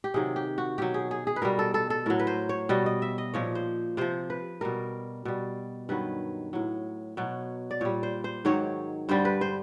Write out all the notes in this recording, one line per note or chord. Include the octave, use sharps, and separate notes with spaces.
G4
C3 D#3 F#3 G#4
G4
F#4
B2 F#3 G4
G#4
G#4
G#4
B4
B2 G3 A#4
A4
A4
A4
A2 F#3 A#4
B4
C5
C#5
B2 G3 D#5
D#5
E5
D#5
A#2 F3 C#5
C5
C3 F3 C5
B4
B2 G3 A#4
B2 G3
G2 D#3 F#3 B4
A2 F#3
B2 F#3
D5
A#2 G3 C#5
C5
C5
G#2 D#3 F#3 C#5
G2 D3 G3 C5
B4
C5